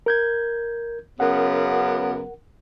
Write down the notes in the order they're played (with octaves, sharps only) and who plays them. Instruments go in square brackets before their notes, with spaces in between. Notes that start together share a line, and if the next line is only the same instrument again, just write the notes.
[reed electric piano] A#4 G6 G#6
[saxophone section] F#2 C#3 B3 [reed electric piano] A#4 F#5